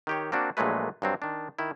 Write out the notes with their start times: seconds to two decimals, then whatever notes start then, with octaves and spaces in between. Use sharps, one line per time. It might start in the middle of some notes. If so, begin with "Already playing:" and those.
0.07 D#3 G4 C#5
0.32 A#3 C4 D4 F#4
0.57 A#1 A#2 F#3 G#3 A3 B4
1.02 G2 F#3 C4
1.22 D#3 D4
1.59 D#3 E4